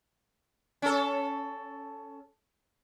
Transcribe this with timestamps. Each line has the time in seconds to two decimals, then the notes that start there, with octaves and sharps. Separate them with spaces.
0.82 C#4 A4